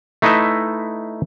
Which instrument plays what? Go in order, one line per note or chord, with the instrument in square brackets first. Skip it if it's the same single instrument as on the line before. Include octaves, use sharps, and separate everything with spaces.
[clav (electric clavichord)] A3 D#4 E4 B4 D#5 E5